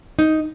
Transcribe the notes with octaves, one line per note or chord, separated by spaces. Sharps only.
D#4